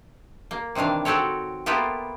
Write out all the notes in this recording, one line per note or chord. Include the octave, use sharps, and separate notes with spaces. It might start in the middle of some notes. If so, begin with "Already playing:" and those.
A#3
C3 D#3 E3 D4 F5
C4 F#4 G4 A4 C#5
A#3 B3 E4 F4 G4 A4